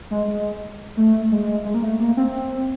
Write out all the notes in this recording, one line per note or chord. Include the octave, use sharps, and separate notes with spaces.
G#3
G#3
A3
G#3
G#3
A#3
A3
A#3
C4